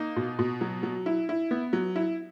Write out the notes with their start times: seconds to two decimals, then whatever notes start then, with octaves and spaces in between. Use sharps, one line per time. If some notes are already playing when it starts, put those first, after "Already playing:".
Already playing: A#3 D#4
0.16 B2
0.39 B2
0.61 F#3
0.83 F#3
1.06 E4
1.29 E4
1.51 B3
1.73 F#3
1.96 E4